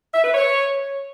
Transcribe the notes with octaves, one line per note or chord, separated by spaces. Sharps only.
E5
B4
C#5